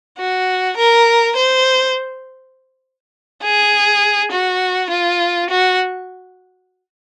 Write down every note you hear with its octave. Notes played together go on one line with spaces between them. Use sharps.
F#4
A#4
C5
G#4
F#4
F4
F#4